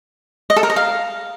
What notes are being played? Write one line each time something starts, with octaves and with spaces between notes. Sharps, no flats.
D#5
A4
A#4
D#5
F5